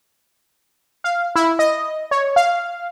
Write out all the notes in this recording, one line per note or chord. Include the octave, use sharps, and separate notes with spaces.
F5
E4
D#5
C#5
F5